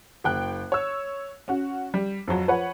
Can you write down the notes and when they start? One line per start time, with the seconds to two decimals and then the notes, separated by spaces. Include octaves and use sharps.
0.24 F#1 G5 F#6
0.72 C#5 E6
1.48 C#4 F#4
1.94 G3
2.28 F2 F#3
2.48 F3 B4 C#5 F#5